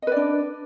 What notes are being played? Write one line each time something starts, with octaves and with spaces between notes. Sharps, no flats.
D4 B4 D5 D#5